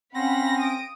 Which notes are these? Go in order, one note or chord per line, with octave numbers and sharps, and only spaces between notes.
C4 C#4 F5 F#5 B5 A#6
D#6 D7